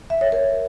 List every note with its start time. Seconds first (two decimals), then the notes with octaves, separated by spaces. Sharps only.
0.10 E5
0.21 C#5
0.32 A#4